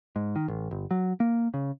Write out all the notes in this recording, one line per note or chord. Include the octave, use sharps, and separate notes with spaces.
G#2
D#3
A1
G1
F#3
A#3
C#3